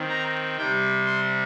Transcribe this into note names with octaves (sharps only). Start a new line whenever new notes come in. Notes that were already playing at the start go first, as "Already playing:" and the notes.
Already playing: D#3 C4
A#5
C3 G3 C4 G5
C6